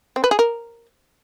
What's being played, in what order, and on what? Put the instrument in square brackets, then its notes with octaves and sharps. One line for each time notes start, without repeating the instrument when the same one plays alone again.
[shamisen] C4
B4
G#4
A#4